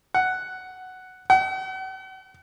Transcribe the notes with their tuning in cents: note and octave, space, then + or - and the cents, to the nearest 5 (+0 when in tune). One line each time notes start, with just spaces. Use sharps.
F#5 +5
F#5 +45